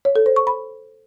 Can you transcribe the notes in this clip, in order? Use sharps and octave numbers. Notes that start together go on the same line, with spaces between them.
C#5
A4
C5
C#6
B5